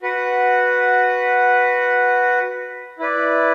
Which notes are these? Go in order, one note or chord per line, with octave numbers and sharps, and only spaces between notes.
F#4 B4 F#5
E4 B4 D5